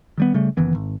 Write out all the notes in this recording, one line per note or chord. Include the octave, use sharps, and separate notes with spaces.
D#3 G3 B3
C#3 G3 A3
F#1 D#3 E3 B3
G#1